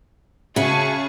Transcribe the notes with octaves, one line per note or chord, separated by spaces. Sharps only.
C#3 F#4 G#4 E5 A5 C#6